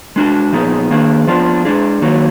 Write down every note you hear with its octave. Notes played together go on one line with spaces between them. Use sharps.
G#3 D4 F#4
A#2 F3 B3 D#4 G#4
D#3 A#3 D4 G#4
F3 B3 D4 F4
G#3 D4 G#4
D#3 F#3 A#3 D#4 F#4